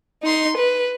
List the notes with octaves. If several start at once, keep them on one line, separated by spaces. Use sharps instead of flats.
D#4 C6
B4